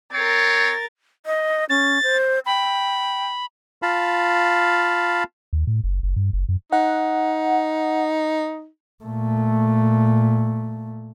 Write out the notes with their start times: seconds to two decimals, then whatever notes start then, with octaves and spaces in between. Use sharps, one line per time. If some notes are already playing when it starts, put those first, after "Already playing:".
0.13 C4 A#4 C#5 A6
1.26 D#5
1.70 C#4 A6
2.03 C5
2.46 G5 B5
3.82 F4 F5 A5 B5
5.53 D#2
5.67 A2
5.84 F#1
6.03 F#1
6.16 G2
6.33 F#1
6.49 F#2
6.73 D#4 F#5
9.04 A#2 A3